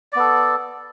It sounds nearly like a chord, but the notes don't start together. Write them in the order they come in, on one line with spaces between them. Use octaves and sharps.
D5 B3 A4